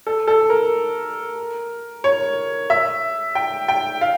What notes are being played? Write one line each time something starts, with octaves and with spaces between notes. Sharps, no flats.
A4
A4
A#4
C#5
E5
G5
G5
F5